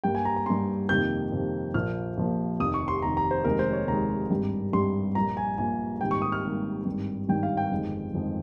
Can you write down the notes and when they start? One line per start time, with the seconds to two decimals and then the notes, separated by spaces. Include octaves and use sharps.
0.04 G2 G3 A#3 G5
0.15 G#5
0.25 A#5
0.36 A#5
0.46 G2 G3 A#3 C6
0.89 F2 C3 D#3 A#3 G6
1.32 F2 C3 D#3 A#3
1.74 A#1 A#2 F3 A#3 F6
2.17 A#1 A#2 F3 A#3
2.60 F1 D#2 D#3 D#6
2.74 C#6
2.88 C6
3.02 F1 D#2 D#3 A#5
3.17 A#5
3.31 C5
3.44 F1 D#2 D#3 G#3 A#4
3.59 C5
3.73 C#5
3.88 F1 D#2 D#3 G#3 A#5
4.31 G#1 G2 G3
4.73 G#1 G2 G3 C6
5.15 A#1 A#2 G3 A#3 A#5
5.37 G#5
5.58 A#1 A#2 G3 A#3 G#5
6.01 G#1 G#2 D#3 G3 A#3 G5
6.11 C#6
6.22 D#6
6.32 F6
6.43 G#1 G#2 D#3 G3 A#3
6.85 G#1 G2 D#3 G3
7.28 G#1 G2 D#3 G3 G5
7.43 F5
7.57 G5
7.72 G1 F2 D#3 G#3
8.14 G1 F2 D#3 G#3